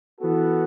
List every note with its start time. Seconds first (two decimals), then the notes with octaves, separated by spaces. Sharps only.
0.19 E3 B3 F#4 A4